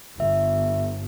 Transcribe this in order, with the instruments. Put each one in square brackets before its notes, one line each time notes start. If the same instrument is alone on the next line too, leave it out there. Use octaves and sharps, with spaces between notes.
[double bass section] G1 [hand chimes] E5